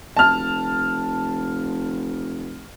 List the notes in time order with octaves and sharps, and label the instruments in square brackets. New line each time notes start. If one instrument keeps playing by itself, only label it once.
[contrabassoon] F1 [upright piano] A5 F6